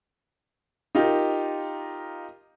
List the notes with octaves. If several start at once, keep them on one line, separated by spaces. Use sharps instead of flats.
D#4 F4 G4 A#4